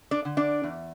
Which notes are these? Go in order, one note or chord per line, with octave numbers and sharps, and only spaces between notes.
D4 D5
D3
D4 D5
E2